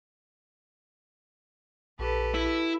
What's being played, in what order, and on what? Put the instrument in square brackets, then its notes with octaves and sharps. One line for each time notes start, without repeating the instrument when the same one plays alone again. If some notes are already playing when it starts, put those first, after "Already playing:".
[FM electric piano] A#1 [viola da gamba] G4 A4 B4
[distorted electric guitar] E4